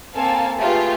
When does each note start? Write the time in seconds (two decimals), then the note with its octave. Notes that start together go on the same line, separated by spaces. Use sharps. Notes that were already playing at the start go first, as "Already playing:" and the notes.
0.15 A#3 C4 A4 F5 G#5 A5
0.59 A3 F4 G4 G#4 B4